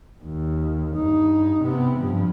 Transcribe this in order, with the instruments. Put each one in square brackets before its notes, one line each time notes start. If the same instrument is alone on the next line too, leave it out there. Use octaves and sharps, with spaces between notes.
[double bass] D#2
G2 D#4
C3 B3
G2 F3